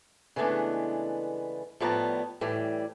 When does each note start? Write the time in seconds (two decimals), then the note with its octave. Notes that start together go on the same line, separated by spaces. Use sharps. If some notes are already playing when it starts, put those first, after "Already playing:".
0.36 C#3 E3 G#3 A3 B3 D4
1.80 A2 F3 G3 B3 A5 A#5
2.41 A2 E3 G3